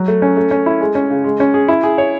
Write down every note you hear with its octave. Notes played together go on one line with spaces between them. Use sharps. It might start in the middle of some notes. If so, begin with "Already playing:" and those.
Already playing: F#3
A3
C#4
A3
C#4
E4
G#3
C#4
C#3
G#3
C#4
G#4
E4
G#4
C#5